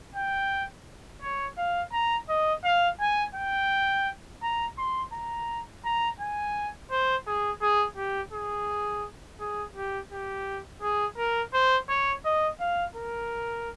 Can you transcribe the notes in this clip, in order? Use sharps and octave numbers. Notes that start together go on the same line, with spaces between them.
G5
C#5
F5
A#5
D#5
F5
G#5
G5
A#5
C6
A#5
A#5
G#5
C5
G#4
G#4
G4
G#4
G#4
G4
G4
G#4
A#4
C5
C#5
D#5
F5
A#4